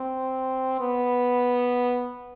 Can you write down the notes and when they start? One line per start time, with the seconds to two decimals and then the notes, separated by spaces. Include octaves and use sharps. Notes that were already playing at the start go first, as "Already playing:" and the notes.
Already playing: C4
0.80 B3